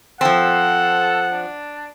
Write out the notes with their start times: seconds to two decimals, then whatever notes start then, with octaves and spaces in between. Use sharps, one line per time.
0.21 F3 C4 A4 F#5
1.31 D4